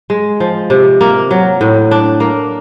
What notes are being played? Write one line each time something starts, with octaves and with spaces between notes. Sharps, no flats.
G#3
F3
C3
A#3
F#3
A2
D4
A#3